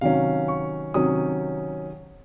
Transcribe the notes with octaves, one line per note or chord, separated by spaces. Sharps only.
C3 D#3 F#3 C#4 F5
C#6
C3 D#3 F#3 C#4 D#6